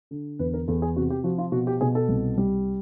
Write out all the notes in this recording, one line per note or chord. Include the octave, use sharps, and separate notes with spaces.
D3
E2 B4
A#4
E2 A4
G#4
C3 F#4
G4
F3 F#4
F4
B2 F#4
G4
B2 G#4
A4
C2
G3